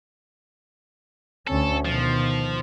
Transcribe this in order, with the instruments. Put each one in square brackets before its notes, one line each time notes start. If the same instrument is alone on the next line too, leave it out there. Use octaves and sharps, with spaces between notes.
[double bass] D2 C#4 [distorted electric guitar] A4
[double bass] B2 D#3 [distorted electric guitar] F3